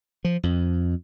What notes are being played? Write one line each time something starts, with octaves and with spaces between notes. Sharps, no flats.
F3
F2